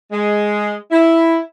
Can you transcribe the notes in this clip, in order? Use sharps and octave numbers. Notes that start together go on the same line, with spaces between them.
G#3
E4